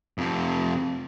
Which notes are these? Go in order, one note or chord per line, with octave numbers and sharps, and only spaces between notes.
F2 C3